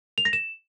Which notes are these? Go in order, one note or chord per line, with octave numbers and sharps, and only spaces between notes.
F7
A#6
E7